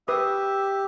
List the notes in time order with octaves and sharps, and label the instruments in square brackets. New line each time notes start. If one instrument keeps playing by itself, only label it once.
[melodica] G4 [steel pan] B4 D#6 [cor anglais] E5